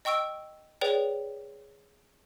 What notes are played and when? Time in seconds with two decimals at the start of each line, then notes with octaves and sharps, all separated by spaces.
0.05 D#5 G5 C#6 E6 D7
0.81 G#4 B4 C#5 D5 G5